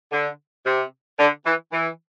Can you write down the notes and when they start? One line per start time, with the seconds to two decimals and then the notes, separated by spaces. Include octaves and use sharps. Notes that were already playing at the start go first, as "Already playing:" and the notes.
0.12 D3
0.66 C3
1.19 D3
1.46 E3
1.72 E3